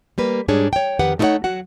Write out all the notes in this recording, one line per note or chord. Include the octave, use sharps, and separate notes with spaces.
G3 A#3 B4
G#2 G3 D4 G#4 C#5
C#5 G5
F2 D#3 G4 B4 F#5
A3 D#4 E4 G4 C#5 F#5
F#3 F#4 F#5